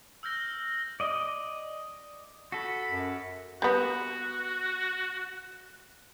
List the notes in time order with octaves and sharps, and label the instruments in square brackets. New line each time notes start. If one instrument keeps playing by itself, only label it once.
[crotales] E6 F6 G6 A#6 G7
[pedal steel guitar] D5 D#5
[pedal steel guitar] F#4 A4 [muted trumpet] B5
[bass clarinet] F#2
[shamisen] G3 B3 [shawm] F#4